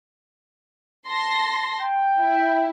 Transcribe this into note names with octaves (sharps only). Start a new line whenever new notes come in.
A5 C6 A#6
G5
E4